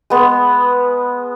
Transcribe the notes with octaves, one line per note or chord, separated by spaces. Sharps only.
G#3 B3